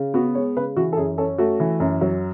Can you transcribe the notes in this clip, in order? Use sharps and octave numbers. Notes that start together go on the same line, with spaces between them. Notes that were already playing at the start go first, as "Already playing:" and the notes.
Already playing: C#3
B3 F#4
G#3 C#5
C#3 B4
E3 F#4
A4
F#2 G#4
C#4 A4
A3 F#4
E3
F#2
F#3